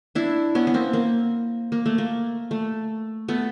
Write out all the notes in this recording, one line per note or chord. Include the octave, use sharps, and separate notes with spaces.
D4 E4
B3 C#4
B3
A#3 C4
A#3
A#3
A3
A#3
A3
A3 B3